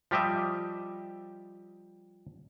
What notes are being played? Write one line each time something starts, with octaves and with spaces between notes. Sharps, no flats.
F3 G3 G4 D#5 E5